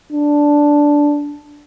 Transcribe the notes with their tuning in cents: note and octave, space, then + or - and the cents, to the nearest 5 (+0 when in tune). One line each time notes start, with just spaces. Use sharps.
D4 -5